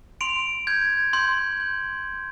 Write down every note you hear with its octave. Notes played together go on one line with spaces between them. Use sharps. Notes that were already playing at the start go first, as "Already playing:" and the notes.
C6 D7 F7
G6 G#6
C6 G6
G6